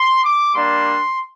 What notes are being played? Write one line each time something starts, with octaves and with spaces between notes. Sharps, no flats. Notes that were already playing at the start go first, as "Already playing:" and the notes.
Already playing: C6
D6
G3 A#3 D4 C6